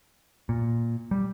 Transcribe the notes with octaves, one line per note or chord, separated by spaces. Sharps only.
A#2
G3